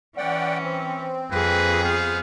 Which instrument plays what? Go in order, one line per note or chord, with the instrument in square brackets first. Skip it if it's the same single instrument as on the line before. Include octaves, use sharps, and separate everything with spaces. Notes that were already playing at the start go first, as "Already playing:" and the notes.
[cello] E3 C#4 [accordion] D5 F#5 G5
[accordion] C4
[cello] F2 G#4 [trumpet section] A#3 B4
[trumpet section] B3 C5 F5